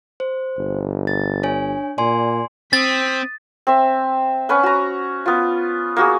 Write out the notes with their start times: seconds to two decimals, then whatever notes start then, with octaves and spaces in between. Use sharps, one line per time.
0.20 C5
0.58 G1
1.07 A6
1.43 D4 C#5 G#5
1.98 A#2 D5 G#5 C6
2.73 C4 D#6 A6 B6
3.67 C4 E5
4.49 C#4 B4 F#5
4.63 F#4 A#5
5.26 B3 F4
5.97 A#3 F#4 G#4